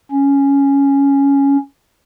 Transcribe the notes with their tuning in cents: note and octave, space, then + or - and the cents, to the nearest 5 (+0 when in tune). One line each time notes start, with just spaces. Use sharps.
C#4 +5